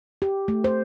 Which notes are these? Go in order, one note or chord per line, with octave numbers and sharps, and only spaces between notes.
G4
A3
C5